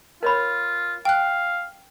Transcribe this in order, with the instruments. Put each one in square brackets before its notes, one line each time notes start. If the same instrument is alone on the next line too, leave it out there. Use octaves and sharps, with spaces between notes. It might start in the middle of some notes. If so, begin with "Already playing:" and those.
[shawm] F4 [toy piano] A#4 C#5 B5
[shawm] F5 [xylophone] G5 F#6